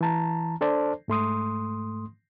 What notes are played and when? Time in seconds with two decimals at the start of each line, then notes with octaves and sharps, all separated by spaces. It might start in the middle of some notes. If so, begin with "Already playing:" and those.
0.01 E3 A5 A#5
0.61 D4 A4 C5 D5 A5
1.08 G#2 A3 C6 D#6